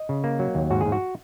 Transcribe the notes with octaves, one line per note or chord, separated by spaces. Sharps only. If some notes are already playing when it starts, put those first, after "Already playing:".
Already playing: D#5
C#3
A#3
F#3
D#2
G#2 F#4
G#2 G#4
F#4